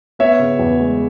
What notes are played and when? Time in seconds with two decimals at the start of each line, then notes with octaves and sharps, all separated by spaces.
0.19 B3 C#5 E5
0.39 C#3
0.59 E2
0.80 G#3